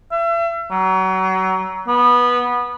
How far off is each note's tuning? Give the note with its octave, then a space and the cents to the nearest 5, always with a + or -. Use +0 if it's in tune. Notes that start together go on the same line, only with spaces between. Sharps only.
E5 +40
F#3 +30
B3 -15